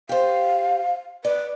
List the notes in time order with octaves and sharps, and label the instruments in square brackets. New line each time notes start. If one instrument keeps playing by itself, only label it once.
[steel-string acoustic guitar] G4 C5 [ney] F5
[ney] B4 [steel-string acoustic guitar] D5